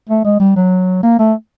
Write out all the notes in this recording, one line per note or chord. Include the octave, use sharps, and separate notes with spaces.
A3
G#3
G3
F#3
A#3
A3